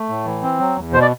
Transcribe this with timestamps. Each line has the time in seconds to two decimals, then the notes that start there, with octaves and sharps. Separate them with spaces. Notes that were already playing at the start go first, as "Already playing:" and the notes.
Already playing: A3
0.09 A2
0.25 E3
0.43 C4
0.60 F#3
0.76 E2
0.92 B2 C5
1.01 D5